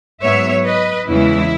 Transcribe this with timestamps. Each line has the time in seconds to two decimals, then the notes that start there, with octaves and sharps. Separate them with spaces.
0.21 G#2 F#3 B3 C#5 E5
0.64 B4 D#5
1.07 E2 C#3 E3 G#3 E4